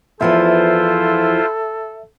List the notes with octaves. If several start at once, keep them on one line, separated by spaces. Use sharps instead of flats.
E2 F3 B3 E4 F4 A4 C5 E5